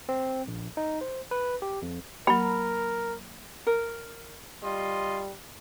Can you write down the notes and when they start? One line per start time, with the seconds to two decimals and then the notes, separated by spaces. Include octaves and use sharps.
0.09 C4
0.47 A#1
0.77 D#4
1.01 C5
1.31 B4
1.62 G4
1.82 F2
2.27 F#3 A#3 A#4 B5
3.67 A#4
4.63 G3 F4 D#5 C6